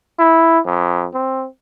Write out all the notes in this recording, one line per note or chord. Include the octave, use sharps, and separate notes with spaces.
E4
F2
C4